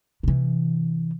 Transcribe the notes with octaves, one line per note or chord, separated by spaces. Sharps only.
C3 E3